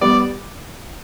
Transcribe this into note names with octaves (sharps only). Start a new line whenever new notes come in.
G3 B3 D5